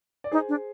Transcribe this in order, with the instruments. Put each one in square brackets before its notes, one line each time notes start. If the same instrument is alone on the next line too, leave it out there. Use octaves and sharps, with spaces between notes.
[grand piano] D5
[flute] D#4 [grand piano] G#4 C5
[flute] D4